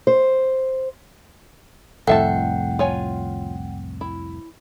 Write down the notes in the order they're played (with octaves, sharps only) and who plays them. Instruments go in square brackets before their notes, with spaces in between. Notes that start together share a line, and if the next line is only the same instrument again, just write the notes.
[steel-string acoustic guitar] C5
[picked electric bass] C2 F2 A2 [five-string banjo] A4 E5 A5 [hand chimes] F#5 G5
[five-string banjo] F4 C#5 G#5
E4